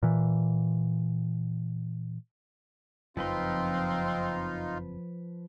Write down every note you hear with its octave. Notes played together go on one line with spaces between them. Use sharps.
A#2 E3
F#1 F2 F3 C4 D#4 F4 B4 C6